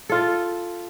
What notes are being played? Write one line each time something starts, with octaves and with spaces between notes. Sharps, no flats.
F4 A4